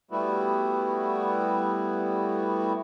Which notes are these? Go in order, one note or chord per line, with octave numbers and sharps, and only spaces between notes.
G3 A3 B3 E4 F#4